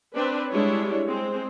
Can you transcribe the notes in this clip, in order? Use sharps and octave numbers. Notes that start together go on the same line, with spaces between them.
C4 D4 B4
G3 G#3 D4 E4 C#5
G#3 C4